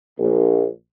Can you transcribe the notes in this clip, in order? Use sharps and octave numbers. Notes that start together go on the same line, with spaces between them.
A#1